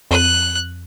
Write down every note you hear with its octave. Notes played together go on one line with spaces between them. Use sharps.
F2 F#6 D#7